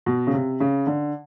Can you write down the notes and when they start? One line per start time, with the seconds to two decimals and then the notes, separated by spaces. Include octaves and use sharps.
0.06 B2
0.27 C#3
0.33 C3
0.60 C#3
0.87 D3